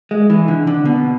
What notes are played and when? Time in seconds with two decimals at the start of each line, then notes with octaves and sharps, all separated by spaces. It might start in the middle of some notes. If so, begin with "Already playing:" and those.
0.11 G#3
0.30 E3
0.48 D3
0.67 D3
0.85 B2